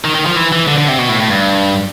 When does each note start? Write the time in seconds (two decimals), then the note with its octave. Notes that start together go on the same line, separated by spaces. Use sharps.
0.05 D#3
0.15 D#3
0.26 F3
0.36 E3
0.52 E3
0.67 D3
0.78 D3
0.88 C3
0.98 B2
1.09 A2
1.20 A2
1.30 G2